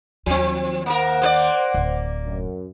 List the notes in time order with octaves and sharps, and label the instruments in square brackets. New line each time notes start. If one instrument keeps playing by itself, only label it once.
[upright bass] D#2 [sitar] F3 C4
[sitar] A#3 A#4 [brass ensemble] C5 F#5
[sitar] A#3 B4 D5
[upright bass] D1
[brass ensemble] F#2